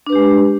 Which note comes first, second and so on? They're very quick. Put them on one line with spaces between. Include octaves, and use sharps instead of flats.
D4 B4 G4 G#3